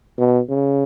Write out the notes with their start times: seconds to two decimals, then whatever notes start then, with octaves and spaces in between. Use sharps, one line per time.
0.18 B2
0.50 C#3